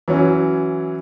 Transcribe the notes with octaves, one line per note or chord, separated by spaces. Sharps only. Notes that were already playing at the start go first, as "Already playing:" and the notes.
E3 F#3 C#4